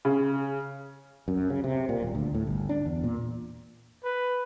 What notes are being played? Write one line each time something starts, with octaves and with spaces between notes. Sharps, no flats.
C#3
F#2
C#3
C3
A#2
D#1
D2
A2
G1
D4
E2
A#2
B4